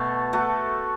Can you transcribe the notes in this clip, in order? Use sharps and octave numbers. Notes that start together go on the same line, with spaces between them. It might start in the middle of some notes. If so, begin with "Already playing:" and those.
Already playing: B2 A3 A4
A3 F#4 A4